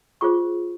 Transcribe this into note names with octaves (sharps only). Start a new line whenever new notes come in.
F4 G#4 C5 C#6